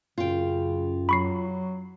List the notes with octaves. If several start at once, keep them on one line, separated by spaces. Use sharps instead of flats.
F#2 C#3 F4 G5
F#3 B5 C#6 C7